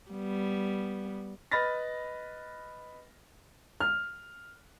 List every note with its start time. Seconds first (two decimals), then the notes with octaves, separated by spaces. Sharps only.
0.11 G3 B3
1.51 B4 D#5 B5 F6 A6 A#6
3.80 F6